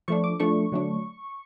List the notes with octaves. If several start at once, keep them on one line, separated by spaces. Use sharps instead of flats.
F3 A3 D4 C#6
D6
F3 A3 D4 C#6
D3 F#3 A3 D4